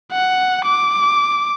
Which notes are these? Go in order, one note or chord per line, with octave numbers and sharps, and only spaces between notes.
F#5
D6